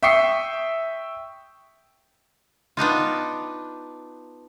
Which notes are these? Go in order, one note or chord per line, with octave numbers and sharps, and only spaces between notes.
E5 G5 C#6 D#6 C7 C#7
B3 D4 D#4 F4